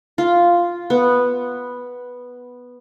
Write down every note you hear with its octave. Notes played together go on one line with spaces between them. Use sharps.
F4
B3